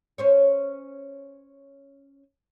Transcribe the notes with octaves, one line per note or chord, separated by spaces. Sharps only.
C#4 C5 C#5